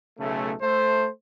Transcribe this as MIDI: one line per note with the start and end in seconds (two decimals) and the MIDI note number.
0.19 0.53 35
0.19 0.53 49
0.19 0.53 57
0.62 1.08 57
0.62 1.08 72